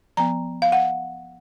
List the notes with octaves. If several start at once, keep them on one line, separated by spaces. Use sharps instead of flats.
F3 B3 A#5
F5
F#5